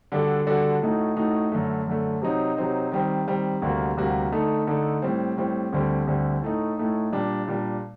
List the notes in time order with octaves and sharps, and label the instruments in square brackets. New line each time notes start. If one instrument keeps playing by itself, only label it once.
[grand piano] D3 G3 D4 F#4 A4
D3 G3 D4 F#4 A4
A2 A3 D#4 F#4
A2 A3 D#4 F#4
F#2 D3 A3
F#2 D3 A3
C3 F#3 C4 D#4
C3 F#3 C4 D#4
D#3 G3 C4
D#3 G3 C4
D2 C3 G3 A#3 F#4
D2 C3 G3 A#3 F#4
D3 A3 D#4 A4
D3 A3 D#4 A4
A2 G3 C4
A2 G3 C4
D2 D3 G3 C4
D2 D3 G3 C4
A2 A3 D#4
A2 A3 D#4
A#2 G3 D4
A#2 G3 D4